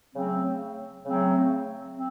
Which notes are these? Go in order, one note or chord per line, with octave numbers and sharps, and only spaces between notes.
C#3 F#3 A3 C4
C#3 F#3 A3 C4
C4